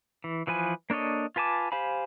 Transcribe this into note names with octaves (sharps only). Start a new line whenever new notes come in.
E3
E3 F3 B4 G#5
A#3 D4 A4 C#5 D#5
F4 B4 G#5 A5 D6
G4 C5 F5 G#5 B5